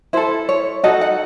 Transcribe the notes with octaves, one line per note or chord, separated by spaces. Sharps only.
E4 A4 C5
C#5
D#4 F#4 A4 D#5
F#5